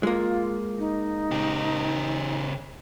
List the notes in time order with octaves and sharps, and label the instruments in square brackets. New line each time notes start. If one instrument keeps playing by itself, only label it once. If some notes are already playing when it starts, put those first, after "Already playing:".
[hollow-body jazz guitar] G#3 A#3 [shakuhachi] F4
[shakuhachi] D#4
[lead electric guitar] C#3 G4